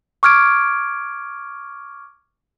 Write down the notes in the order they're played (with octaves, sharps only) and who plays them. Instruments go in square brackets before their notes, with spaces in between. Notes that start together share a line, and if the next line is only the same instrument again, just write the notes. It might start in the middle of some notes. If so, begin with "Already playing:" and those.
[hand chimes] C#6 D6 F6 G#6 D7